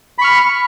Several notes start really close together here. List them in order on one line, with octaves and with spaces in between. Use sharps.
B5 C#6 F6